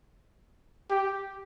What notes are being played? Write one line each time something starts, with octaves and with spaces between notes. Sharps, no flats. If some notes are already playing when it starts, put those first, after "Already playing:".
G4